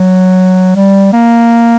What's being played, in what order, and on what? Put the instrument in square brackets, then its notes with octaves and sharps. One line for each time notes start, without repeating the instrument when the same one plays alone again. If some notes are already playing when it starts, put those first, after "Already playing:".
Already playing: [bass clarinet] F#3
G3
A#3